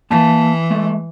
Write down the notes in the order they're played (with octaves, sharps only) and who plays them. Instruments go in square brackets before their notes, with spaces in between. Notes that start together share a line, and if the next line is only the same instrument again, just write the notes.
[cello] E3 [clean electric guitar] A#3 A5
[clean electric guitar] G#3 A3